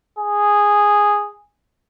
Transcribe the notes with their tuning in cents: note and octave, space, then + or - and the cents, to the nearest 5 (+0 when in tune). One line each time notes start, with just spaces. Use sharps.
G#4 -5